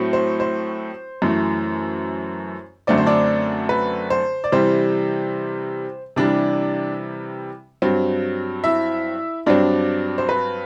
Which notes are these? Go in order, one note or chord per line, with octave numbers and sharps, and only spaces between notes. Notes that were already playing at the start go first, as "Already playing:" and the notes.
Already playing: A2 F#3 A3 C4
C5
C5
F#2 E3 A3
F#2 D3 A3 C4 D5
C5
D4 D5
B4
C5
D5
C3 E3 G3 C5
C3 E3 G3 D4 D5
G2 F#3 C4
E4 E5
G2 F#3 C4 D4 D5
C5
B4